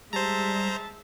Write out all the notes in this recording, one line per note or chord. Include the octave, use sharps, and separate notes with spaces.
G3 G#3 C5 E5 A5 A#5